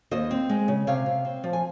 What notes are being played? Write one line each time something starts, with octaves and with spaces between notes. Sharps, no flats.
D#2 C5 D#5
C4
G#3
C#3
C3 C#5 F5
C3
C4
F3
G#5